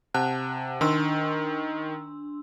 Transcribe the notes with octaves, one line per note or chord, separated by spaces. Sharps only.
C3 F#5 A5 F#6
D#3 D4 C6 E6